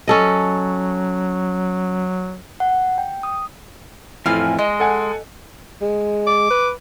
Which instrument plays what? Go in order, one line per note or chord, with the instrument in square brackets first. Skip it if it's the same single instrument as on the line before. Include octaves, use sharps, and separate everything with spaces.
[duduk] F#3 [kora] C#4 A4 D#5
[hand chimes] F#5
G5
D#6
[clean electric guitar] F2 A2 E3 [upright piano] E4 [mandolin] F4 G#5 F6
[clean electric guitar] G#3 [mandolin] D#5
[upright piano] A4 F#5 G#5
[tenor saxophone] G#3
[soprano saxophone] D6
[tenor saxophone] B4